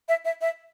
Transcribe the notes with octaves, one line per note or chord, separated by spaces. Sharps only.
E5
E5
E5